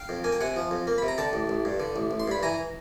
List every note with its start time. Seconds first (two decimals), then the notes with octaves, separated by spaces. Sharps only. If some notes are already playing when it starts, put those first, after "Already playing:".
Already playing: F5 G5
0.09 F2
0.24 A#3 G#5
0.32 G5
0.41 C3 F#5 G#5
0.56 F3
0.71 F2
0.87 A#3
0.98 C3 B5
1.08 A#5
1.18 D3 G5 A5
1.33 A1
1.49 A1
1.65 G2
1.80 D3
1.96 A1
2.11 A1
2.20 C6
2.28 G2 B5
2.43 E3 G#5 A#5